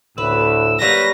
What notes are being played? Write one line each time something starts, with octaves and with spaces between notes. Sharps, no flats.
D2 A2 B4 E6
F#3 G3 A#3 B4 A#6